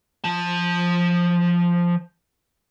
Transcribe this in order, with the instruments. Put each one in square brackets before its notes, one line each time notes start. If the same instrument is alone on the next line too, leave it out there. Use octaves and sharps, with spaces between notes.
[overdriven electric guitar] F3 A5